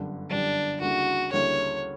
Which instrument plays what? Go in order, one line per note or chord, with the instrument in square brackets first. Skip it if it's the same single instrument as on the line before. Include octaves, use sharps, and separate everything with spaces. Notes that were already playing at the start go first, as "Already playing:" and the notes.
Already playing: [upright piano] G1 F#2 D3 G3
[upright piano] G1 F#2 D3 G3 [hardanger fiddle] D4
[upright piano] D2 C#3 G3 A#3 E4 [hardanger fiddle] F#4
[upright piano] D2 C#3 G3 A#3 E4 [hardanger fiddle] C#5